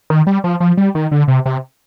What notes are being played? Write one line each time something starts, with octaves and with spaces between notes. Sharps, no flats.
D#3
G3
F3
F3
G3
D#3
D3
C3
C3